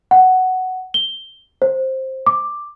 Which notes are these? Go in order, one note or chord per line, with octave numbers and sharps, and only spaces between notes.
F#5
G7
C5
D6